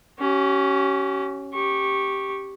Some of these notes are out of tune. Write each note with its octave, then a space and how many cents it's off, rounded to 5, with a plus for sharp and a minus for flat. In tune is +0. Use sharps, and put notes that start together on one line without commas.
C#4 +0 G4 -45
G4 +0 C#6 -15